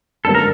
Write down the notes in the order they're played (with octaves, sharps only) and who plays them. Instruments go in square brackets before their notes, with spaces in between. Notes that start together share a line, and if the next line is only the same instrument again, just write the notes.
[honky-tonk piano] G#1 F#2 D3 G3 A#3 [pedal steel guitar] A4
[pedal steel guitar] A#4